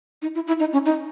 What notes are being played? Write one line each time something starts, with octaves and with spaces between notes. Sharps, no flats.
D#4
E4
E4
D#4
C#4
D#4